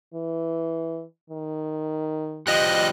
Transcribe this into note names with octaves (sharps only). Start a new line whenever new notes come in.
E3
D#3
F3 G3 D#5 F#6